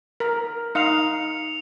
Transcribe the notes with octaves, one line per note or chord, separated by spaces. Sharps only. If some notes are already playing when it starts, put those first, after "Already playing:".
A#4
D#4 F5 C#7 F7